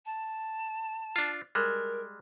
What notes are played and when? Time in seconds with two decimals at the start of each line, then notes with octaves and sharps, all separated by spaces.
0.05 A5
1.16 D4 F4
1.55 G3 G#3 A#4